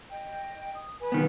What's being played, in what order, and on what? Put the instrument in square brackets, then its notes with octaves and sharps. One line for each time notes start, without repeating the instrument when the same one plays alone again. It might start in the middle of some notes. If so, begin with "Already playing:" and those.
[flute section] D#5 G5
D#6
B4 G#5
[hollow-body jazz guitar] B1 D#3 B3